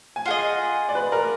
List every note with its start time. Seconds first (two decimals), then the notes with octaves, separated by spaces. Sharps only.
0.16 G#5
0.26 F4 G#4 D#5 F#5
0.89 D5
0.95 B4
1.12 A#4